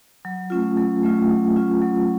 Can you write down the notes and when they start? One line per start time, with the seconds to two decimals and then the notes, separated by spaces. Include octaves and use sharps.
0.25 F#3
0.50 A3 C#4 F4
0.77 F#3
1.03 A3 C#4 F4
1.29 F#3
1.56 A3 C#4 F4
1.82 F#3